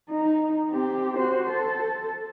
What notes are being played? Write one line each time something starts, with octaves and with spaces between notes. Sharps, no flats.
D#4
C4 G4
F#4 C5
A4